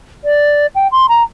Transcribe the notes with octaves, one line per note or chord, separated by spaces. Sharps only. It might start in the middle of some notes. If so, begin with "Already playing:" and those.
D5
G5
C6
A#5